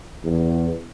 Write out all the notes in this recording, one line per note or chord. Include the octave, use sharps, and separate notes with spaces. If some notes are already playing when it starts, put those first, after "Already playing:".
E2